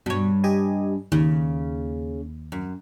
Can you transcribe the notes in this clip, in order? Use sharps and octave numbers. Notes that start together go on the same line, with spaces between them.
G2 B2 C#5
G4 D#5 G#5
D#2 C#3
F#2